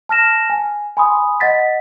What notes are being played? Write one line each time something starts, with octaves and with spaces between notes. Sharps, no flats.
A5 F6 A#6 E7
G#5
G#5 B5 C6 D#6
D#5 F#5 A6 B6